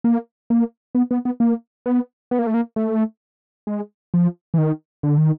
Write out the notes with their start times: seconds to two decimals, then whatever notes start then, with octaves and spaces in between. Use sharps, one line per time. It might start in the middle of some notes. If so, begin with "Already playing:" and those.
0.04 A#3
0.50 A#3
0.95 B3
1.11 B3
1.25 B3
1.40 A#3
1.86 B3
2.31 B3
2.39 A#3
2.47 A3
2.54 A#3
2.76 A3
3.67 G#3
4.14 F3
4.54 E3
4.58 D#3
5.03 D3
5.18 D#3